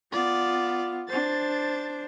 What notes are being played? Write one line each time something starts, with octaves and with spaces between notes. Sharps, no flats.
B3 F4 D5
D4 C5 A6